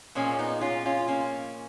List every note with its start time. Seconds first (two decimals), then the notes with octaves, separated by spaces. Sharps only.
0.15 A#2 F3 G#3 A#3 C#4
0.39 B3 D#4
0.61 C#4 F4
0.85 C#4 F4
1.08 A#3 C#4